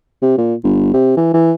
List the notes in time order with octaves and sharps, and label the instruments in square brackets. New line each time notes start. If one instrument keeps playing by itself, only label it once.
[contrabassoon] C3
A#2
G1
C3
E3
E3